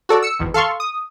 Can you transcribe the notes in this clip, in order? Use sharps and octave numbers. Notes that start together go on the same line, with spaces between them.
F#4 A4 D5
E6 C#7
G#1 E2
A4 F5 C6 C#6
D#6